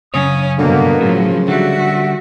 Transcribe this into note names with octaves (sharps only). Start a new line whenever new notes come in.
F#2 C#3 C#4 C#5 D#6
G2 B2 D3 A#3 B3
A2 C#3 F3 F#3
D3 G3 F#4 E5 F#5